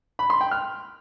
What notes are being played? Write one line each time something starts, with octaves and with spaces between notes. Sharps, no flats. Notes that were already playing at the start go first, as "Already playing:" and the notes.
B5
C6
G5
F6